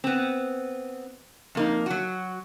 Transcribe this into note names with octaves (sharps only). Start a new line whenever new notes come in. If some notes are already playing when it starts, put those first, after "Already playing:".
B3 C4
F2 A#3 D#4
F#3 F#4